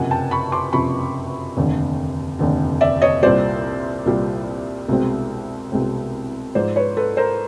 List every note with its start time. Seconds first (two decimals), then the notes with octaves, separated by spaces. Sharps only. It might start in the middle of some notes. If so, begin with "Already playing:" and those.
Already playing: F#1 F2 C3 F#5 G#5
0.11 G5 A5
0.31 B5 C#6
0.52 C6 D6
0.72 F#1 F2 C3 B5 C#6
1.57 F1 D#2 D3
2.39 F1 D#2 D3
2.81 D5 E5
3.02 C#5 D#5
3.22 C2 A#2 G3 C5 D5
4.06 C2 A#2 G3
4.88 C2 B2 G#3 C4
5.72 C2 B2 G#3 C4
6.55 G#2 F3 G#3 C5 D5
6.76 B4 C#5
6.97 A4 B4
7.17 A#4 C5